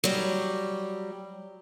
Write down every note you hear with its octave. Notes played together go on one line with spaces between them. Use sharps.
F#3 G3